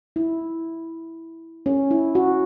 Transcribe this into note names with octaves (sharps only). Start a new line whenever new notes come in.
E4
C#4
E4
F#4